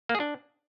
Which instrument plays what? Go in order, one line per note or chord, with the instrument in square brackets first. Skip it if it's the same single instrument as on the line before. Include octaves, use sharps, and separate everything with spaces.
[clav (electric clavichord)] A#3
G#4
D4